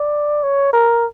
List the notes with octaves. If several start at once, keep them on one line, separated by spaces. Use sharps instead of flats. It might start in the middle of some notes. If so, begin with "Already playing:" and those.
Already playing: D5
C#5
A#4